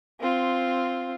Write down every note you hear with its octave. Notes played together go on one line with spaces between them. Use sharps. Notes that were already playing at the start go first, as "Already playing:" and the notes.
C4 F4